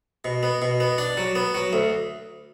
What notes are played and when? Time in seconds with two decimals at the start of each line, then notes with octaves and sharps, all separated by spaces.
0.25 B2
0.43 B3
0.62 B2
0.80 B3
0.98 D4
1.17 F#3
1.35 B3
1.54 F#3
1.73 D2